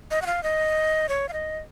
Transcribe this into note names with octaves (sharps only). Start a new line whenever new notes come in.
D#5
F#5
F5
D#5
C#5
F5
D#5